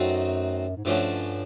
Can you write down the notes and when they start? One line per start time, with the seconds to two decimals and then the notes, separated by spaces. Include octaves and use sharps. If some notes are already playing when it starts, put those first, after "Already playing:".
Already playing: F#2 F#3 A3 C4 D#4 F#4
0.77 G#2
0.85 G2 D3 F3 A3 C#4 F#4